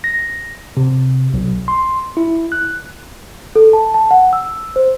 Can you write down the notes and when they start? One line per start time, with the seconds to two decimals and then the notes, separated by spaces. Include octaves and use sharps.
0.04 A#6
0.77 C3
1.34 B1
1.68 C6
2.17 E4
2.52 F#6
3.56 A4
3.73 A5
3.94 A5
4.11 F#5
4.33 E6
4.76 C5